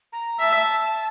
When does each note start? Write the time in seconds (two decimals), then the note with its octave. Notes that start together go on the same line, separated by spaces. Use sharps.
0.13 A#5
0.39 E5 A5